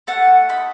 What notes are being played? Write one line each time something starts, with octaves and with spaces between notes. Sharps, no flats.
A3 F#5 A5
D#4 B5